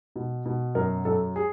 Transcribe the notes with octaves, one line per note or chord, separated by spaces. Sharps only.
B2
B2
F#2 A#4
F#2 A4
G#4